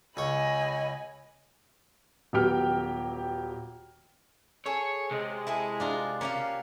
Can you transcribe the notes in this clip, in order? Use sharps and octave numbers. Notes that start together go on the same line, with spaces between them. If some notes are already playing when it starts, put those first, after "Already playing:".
C#2 C#5 D#5 G#5 B5
D#1 F#3 B3 G4 G5 F6
G#4 A4 C#5
C3 G#3
E4 G#4 A4
D4 F4 A#5
A#3 C#4 G4 F5